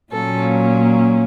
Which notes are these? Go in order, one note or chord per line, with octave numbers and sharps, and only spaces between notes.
A#2 F#3 A#3 C#4 A4